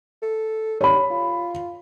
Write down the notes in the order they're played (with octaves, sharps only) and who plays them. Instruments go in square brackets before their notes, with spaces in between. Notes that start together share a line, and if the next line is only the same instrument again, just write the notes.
[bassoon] A4
[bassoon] G3 [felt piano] C#5 B5
[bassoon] F4